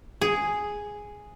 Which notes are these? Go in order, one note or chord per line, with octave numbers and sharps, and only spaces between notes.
G#4